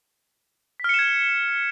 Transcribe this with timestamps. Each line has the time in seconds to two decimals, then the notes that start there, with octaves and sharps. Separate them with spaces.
0.80 B6
0.84 F6
0.89 C#7
0.94 E7
0.99 G#6